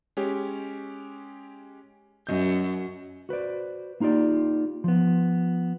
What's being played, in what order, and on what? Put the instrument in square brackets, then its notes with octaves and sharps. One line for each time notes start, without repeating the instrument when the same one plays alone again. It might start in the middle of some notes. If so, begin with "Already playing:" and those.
[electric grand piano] G#3 C#4 G4
[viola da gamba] F#2 [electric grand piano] D#5 G6
[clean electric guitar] F#4 B4 C5 D5
A#3 D#4 F4 G4 D5
F3 B3